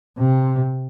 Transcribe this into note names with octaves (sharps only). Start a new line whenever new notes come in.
C3